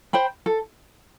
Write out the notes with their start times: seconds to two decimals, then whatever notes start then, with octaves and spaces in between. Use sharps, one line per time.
0.13 C5 G5 B5
0.46 A4